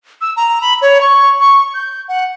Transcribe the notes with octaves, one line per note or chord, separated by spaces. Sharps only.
E6
A#5
B5
C#5
C#6
C#6
G6
F#5